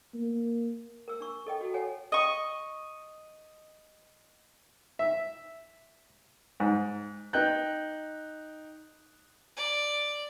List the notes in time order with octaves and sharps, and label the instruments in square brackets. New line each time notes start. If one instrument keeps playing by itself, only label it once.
[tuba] A#3
[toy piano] A#4 E6
D4 C#6
A4 D#5 G5
F#4 A4
A4 C#5 F#5 G#5
[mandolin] D#5 C#6
[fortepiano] E5
G#2
[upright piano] D#4 G5 F#6 G6
[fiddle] D5